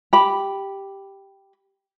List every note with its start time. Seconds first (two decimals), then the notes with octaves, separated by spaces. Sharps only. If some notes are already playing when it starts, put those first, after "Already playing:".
0.13 G4 B5